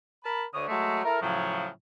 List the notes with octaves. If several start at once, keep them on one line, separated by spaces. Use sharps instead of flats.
A#4 A5 B5
D2 D3 C#5 D#6
F#3 G#3 A3
E4 A4 A#4
A2 C#3 F3 F#3